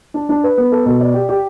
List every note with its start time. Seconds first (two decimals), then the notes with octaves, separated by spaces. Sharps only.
0.14 D4
0.29 D4
0.44 B4
0.57 B3
0.72 A4
0.86 B2
1.01 D5
1.14 G4
1.29 G4